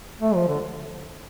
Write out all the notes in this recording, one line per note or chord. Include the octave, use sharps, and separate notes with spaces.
A3
F3
D3